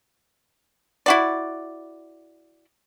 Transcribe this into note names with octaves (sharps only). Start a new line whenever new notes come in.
E4 F#4 D5